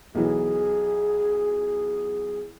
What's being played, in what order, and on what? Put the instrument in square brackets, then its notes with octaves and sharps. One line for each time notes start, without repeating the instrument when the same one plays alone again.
[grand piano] B1 E3 [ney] G#4